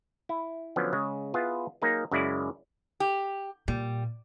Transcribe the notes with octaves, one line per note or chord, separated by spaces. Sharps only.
E4
D3 F3 F#3 B3 C#4
C#3 G#3
B3 E4 F4 G#4
F#3 A#3 D#4 G#4
F#2 C#3 G#3 E4 D5
G4
A#2 G3